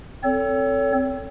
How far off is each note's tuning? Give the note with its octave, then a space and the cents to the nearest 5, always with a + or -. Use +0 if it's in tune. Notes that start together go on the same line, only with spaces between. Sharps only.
C4 +0 A4 +10 C#5 +30